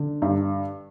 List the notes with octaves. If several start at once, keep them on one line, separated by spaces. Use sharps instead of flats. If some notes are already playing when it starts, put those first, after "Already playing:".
Already playing: D3
G2